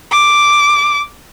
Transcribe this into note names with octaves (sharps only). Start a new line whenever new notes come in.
D6